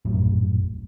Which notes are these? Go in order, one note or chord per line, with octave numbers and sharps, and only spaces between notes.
E1 A#1 F#2 A2